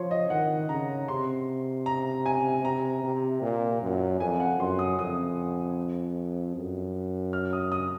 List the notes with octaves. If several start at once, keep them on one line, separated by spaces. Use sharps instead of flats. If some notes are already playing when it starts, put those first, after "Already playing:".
Already playing: F3 C#5 C6
D#5
D#3 F#5
C#3 A#5
C3 C6
A#5
G#5
C3 A#5
C3
A#2
F#2
F2 G#5
F#5
F#2 C6
D#6
F2 D#6
F#2
F6
D#6
D#6